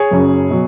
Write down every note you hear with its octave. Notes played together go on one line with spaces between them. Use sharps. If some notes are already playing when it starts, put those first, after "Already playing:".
Already playing: G#4 C#5
F#1 F#2 C#3 F#3
B2 F#3